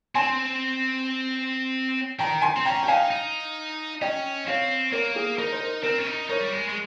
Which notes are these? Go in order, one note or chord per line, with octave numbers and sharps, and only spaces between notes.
C4 G#5 C6
D#3 G5 A#5
G#5 C6
C4
C#4 G5 A#5
G5
D#4 F5 G#5
D#4
C#4 D#5 G5
C4 C#5 F5
A#3 A#4 C#5
G#4
D#4 A#4
C5
A#4
C4 A#4
C#4
D#4
D#4 A#4 C#5
G3
G#3
G#3